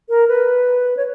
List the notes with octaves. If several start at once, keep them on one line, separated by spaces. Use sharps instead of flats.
A#4
B4
C#5